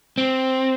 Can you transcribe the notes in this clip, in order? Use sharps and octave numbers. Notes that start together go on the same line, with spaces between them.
C4